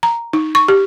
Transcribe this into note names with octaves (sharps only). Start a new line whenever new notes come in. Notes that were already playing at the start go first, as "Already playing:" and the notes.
A#5
D#4
C#6
G4